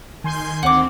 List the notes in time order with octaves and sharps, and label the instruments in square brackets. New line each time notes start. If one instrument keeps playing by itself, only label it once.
[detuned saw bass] D#3 [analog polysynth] G#5 C6 G6
[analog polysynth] D2 C4 [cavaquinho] F#5 D6